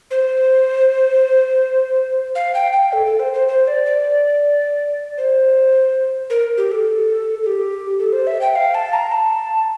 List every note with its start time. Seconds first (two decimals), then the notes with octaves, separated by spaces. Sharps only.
0.11 C5
2.35 F5
2.55 G5
2.73 G5
2.93 A4
3.06 A4
3.20 C5
3.34 C5
3.48 C5
3.67 D5
3.86 D5
5.18 C5
6.30 A#4
6.58 G4
6.72 A4
7.43 A4
7.46 G4
7.99 A4
8.13 C5
8.27 E5
8.41 G5
8.56 F5
8.75 A5
8.93 A#5
9.12 A5